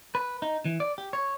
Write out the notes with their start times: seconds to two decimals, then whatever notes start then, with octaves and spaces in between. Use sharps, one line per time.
0.15 B4
0.42 D#4
0.65 E3
0.80 D5
0.98 G4
1.13 C#5